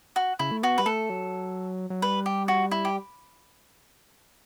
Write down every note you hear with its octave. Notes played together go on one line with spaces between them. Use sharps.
F#4
C#3 E4
A3
B3 F#4
G3 B4
A3 A4
F#3
F#3
G3 B4
G4
F#4
E4
G4